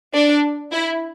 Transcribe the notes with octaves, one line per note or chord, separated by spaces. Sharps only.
D4
E4